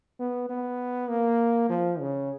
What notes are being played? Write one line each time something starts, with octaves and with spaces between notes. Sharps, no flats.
B3
B3
A#3
F3
C#3